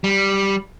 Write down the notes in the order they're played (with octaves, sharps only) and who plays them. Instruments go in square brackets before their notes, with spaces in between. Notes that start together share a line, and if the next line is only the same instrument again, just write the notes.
[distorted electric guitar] G3